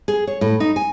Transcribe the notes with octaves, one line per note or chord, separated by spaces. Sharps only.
G#4
C#5
A2
D#4
G#5